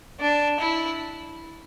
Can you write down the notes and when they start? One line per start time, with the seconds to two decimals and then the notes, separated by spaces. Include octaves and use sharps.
0.20 D4
0.59 E4